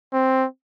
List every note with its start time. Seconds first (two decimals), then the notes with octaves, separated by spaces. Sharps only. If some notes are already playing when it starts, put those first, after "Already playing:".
0.13 C4